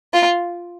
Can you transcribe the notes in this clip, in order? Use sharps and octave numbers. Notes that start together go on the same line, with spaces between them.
F4